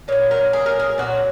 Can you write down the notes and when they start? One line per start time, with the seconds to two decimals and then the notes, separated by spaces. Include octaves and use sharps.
0.08 A#2 C#5
0.12 F#3
0.31 A#4
0.53 G#4
0.66 A#4
0.79 G#4
0.98 A#2 F#3 F#4